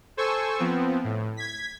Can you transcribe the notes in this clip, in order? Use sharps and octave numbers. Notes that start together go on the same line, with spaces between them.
A4 C5 G#5 C#6 E6
F3 B3 C4
A2
G#6 B6